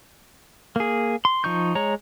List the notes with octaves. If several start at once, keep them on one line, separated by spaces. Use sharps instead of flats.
A#3 G#4
C6
F3 D#4 C#6 G6
G#3 C#5 A#5